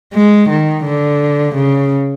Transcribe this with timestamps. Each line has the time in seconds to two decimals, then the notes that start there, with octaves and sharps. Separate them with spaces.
0.14 G#3
0.49 D#3
0.85 D3
1.55 C#3